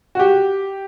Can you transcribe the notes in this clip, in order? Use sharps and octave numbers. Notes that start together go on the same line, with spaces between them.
F#4
G4